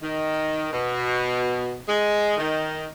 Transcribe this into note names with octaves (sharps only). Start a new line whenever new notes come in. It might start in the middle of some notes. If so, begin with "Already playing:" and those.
D#3
B2
G#3
D#3